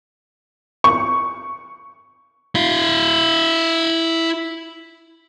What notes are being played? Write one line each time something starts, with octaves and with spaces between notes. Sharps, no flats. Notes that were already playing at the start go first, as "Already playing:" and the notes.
C#6
E4 F5